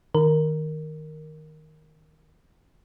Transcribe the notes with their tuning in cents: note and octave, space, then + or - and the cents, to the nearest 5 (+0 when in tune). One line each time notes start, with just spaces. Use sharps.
D#3 +0 A#4 +0